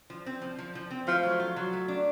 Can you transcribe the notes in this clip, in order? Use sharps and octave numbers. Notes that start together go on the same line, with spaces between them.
F3
C4
F3
F3
F3
C4
F3 A3
F#3
F4
F#3
A3
D4